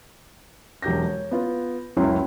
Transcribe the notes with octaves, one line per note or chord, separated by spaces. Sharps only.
E1 F#3 G4 G6 A#6
C#5
B3 F4 B4
F#1 C#2 F#3 C#4 E4 C6